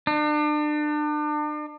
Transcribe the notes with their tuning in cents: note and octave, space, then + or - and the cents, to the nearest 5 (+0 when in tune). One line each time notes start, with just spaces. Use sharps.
D4 +35